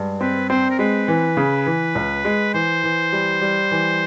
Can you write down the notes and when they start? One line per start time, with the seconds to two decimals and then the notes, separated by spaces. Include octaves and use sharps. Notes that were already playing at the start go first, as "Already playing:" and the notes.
Already playing: G2 G#3
0.21 C4 B4
0.50 C4 C5
0.71 A#4
0.79 G#3 B4
1.08 E3
1.37 C#3
1.66 E3
1.95 C#2
2.25 G#3
2.54 E3 C5
2.84 E3
3.12 G3
3.42 G3
3.71 E3